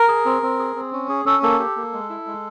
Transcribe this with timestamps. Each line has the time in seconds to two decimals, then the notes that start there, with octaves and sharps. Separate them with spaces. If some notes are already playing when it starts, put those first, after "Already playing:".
Already playing: A#4
0.08 G#4
0.25 C4
0.42 C4
0.59 G#4
0.76 C4
0.93 C#4
1.09 G#4
1.25 C#4 A4
1.43 A#3 A4
1.59 G4
1.76 A#3
1.93 G#3
2.10 E4
2.26 G#3